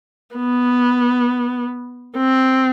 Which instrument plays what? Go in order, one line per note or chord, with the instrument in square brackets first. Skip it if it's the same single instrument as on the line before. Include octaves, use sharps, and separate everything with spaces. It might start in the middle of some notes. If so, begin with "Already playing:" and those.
[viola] B3
C4